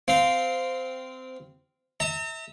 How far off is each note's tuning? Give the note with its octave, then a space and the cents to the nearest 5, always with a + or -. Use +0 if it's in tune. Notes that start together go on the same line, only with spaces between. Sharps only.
C4 -15 F5 +0
E5 -30 A#5 -45